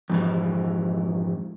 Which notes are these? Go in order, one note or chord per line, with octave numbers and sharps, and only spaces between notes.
F2 G#2 E3